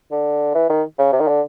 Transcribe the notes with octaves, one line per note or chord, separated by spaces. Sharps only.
D3
E3
D#3
C#3
C3
D#3
D3